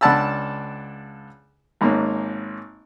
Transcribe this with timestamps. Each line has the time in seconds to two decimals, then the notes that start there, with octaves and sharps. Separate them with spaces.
0.01 C#2 D4 F#5 A5 B5 E6
1.81 G#1 G#2 A#3 C#4